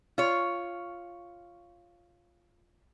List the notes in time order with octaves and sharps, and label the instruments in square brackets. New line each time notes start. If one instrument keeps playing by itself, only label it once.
[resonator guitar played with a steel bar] F4 C#5